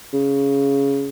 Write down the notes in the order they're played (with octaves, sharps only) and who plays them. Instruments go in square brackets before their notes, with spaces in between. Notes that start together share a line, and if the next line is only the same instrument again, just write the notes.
[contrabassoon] C#3